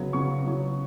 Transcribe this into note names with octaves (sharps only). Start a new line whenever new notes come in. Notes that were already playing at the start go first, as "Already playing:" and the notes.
Already playing: C#3 F#3 B3
C#3 F#3 B3 C#6
C#3 F#3 B3